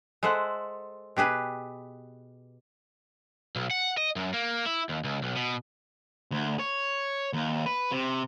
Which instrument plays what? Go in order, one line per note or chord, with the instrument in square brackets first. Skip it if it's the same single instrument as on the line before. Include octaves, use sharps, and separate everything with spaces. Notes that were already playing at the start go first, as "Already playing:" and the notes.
[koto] G#3 A4 C5 E5 F#5
B2 G4 G#4 B4
[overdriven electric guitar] B1
F#5
D#5
F#2
A#3
E4
D#2
C#2
B1
B2
[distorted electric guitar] D2
C#5
D#2
B4
C3